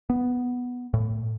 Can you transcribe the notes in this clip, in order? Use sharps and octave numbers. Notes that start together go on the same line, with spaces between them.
B3
A2